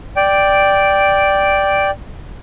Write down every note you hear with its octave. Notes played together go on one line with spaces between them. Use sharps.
D5 G5